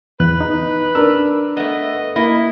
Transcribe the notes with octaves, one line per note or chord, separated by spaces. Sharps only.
E2 B4 F#6
D#4
D4 A#4 E6
A3 B3 D#5
A#3 E4 D#5